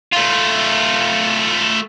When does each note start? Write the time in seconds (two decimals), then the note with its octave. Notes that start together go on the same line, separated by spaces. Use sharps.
0.12 A3 F4